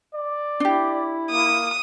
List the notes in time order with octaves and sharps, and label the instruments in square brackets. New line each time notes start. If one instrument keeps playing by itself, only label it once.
[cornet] D5
[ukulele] D4 G4 [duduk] E4
[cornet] A#3 [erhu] D#6